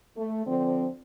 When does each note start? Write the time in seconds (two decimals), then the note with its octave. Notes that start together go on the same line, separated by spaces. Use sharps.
0.17 A3
0.47 D3 F3 C4